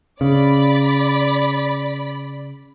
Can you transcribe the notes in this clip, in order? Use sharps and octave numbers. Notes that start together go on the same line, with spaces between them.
C#3 D5 B5